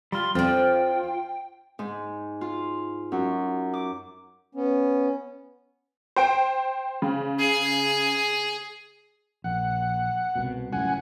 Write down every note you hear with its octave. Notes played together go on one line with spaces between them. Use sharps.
G3 F4 C6
F2 F3 D4 F4 G5
G#2
F4
F#2
D6
B3 C#4
C5 G5 D7
C#3
G#4
A#1 F#5
C2 B2
C#2 F#2 A2 F#5 G#5